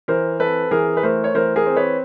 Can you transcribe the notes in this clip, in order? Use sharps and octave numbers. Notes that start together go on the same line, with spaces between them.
E3 A#4 C5
C4 A4 B4
E3 G#4 A#4
B4
A3 A#4 C5
C#5
E3 A#4 C5
G#4 A#4
C4
B4 C#5